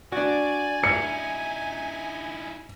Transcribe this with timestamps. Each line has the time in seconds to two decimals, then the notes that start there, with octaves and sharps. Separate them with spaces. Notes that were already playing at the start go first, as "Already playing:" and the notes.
0.12 D4 F#4 D5 G#5
0.84 D#4 E4 C#7